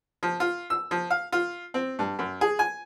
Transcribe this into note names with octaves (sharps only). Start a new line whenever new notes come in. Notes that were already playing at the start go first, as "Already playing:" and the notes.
F3
F4
E6
F3
F5
F4
C4
G2
F#2
G#4
G#5